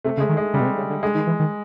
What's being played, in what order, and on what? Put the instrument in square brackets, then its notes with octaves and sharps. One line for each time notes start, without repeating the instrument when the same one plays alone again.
[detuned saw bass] C3 [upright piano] A3
[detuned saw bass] C#3
[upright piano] G#3
[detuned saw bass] D#3
[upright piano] G#3
[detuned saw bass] C#3 [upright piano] G3
[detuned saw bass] B2
C3
C#3
D3
[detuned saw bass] D3 [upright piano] G#3
[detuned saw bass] D#3
E3
D#3